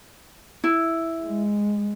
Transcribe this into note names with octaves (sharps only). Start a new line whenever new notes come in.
E4
G#3